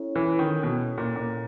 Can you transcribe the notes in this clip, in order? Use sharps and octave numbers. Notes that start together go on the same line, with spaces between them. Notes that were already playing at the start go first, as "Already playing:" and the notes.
Already playing: C#4 E4 A4 C#5
E3
D#3
B2
A#2
A#2